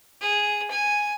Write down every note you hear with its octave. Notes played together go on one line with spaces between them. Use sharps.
G#4
G#5